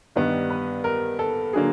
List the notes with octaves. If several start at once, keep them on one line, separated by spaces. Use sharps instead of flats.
G2 D#3 G3 B3
B4
A#4
A4
D3 F#3 A#3 G#4